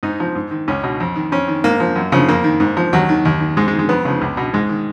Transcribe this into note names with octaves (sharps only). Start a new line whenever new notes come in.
G#2 D#4
F3
G#2
D#3
C#2 C#4
B2
F2
D#3
F2 C#4
D#3
G#2 A#3
F3
F#2
C#3 F3
F2 A#3
D#3
G#2
F3
D#2 F#3
D#3
D#2
D#3
G#2 G#3
G#3
D#3
G#3
F2 B3
C#3 F3
C#2
B2
G#2 G#3
D#3